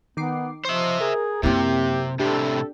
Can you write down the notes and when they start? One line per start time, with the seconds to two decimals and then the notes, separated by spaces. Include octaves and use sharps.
0.17 D#3 B3 D6 C7
0.65 F3 C5 D#5 E5 C#6
1.00 G#4 A#4
1.43 F#2 C3 A#3 C4 E4 G4
2.19 A2 C3 D4 G4 A4